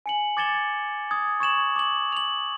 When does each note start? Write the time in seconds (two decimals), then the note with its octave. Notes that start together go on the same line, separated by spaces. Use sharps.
0.06 G#5 C#7 F#7
0.37 D6 G#6 A6 C#7 E7 G7
1.11 D#6 G#6
1.40 C#6 G#6 E7 F#7
1.76 D6 F#7
2.12 F7 F#7